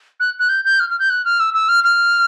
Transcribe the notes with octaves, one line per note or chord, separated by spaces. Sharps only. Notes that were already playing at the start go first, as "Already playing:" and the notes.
F#6
F#6
G6
G6
F6
F6
G6
F#6
F6
E6
E6
F6
F6